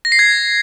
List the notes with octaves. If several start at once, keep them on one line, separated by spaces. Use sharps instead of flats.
A#6
C7
G#6